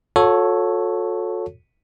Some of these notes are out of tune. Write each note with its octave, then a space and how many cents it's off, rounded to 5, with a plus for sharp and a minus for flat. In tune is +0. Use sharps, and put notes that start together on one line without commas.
F#4 -45 A4 +0 C#5 +0